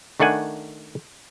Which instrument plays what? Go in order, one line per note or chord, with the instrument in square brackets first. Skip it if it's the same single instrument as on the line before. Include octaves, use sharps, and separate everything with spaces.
[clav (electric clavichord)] D#3 A3 D4 F#5 G#5